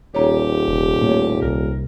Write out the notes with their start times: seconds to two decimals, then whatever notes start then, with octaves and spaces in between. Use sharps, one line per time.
0.15 D#1 G4 C#5 A#5
0.68 F1
1.02 A2 A#3 C#5
1.42 C2 A#4